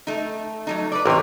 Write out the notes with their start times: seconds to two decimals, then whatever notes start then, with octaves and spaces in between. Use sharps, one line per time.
0.07 A3 D#4
0.67 F#3 A3 D#4
0.92 B4 D5
1.06 A1 C3 A#4 C#5